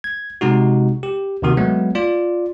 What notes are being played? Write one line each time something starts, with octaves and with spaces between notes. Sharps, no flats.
G#6
C3 G#3 D#4 F#4
G4
D#2 C3 D#3 F#4
F#3 G#3 A3 B3
F4 D5